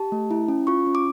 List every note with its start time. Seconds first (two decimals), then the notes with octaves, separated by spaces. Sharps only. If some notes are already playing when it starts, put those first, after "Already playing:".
Already playing: G4 A5
0.12 A3
0.31 E4
0.48 C#4
0.67 F4 C#6
0.87 C#4
0.95 D6